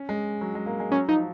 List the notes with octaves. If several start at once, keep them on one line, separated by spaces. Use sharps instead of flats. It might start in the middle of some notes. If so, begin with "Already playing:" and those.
Already playing: C#4
G#3
F#3
G#3
A#3
G#3
F#3 C#4
F3 D#4